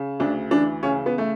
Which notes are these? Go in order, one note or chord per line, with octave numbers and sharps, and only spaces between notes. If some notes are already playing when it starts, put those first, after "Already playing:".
Already playing: C#3
D2 D4
E3 D4
C#3 C#4
B3
A3